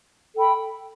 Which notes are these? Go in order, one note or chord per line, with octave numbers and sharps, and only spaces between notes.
A4 G5 B5